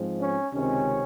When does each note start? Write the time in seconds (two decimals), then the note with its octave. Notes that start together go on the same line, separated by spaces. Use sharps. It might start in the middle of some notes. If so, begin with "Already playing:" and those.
Already playing: G#2 F3 G#3 C4
0.20 C#4
0.53 C#2 C3 D#3 G#3 C4 C#4